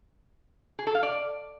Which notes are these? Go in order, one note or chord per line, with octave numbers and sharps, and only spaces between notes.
G#4
A4
F5
D5